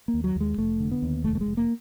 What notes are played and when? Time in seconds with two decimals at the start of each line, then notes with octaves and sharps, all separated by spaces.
0.08 A#3
0.14 D#2
0.24 F#3
0.36 D#2 G#3
0.58 F1 A3
0.80 D3
0.91 B3
1.02 D#2
1.24 F1 A3
1.35 A3
1.41 G#3
1.46 F1
1.57 A#3